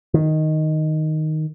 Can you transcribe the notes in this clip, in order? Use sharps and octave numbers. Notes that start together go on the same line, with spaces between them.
D#3